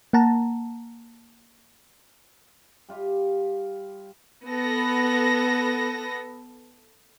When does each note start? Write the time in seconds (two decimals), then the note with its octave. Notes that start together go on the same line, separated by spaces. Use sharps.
0.13 A#3 F#5 A5 A#5
2.89 G3 F4 G4
4.47 B3 A4 A#6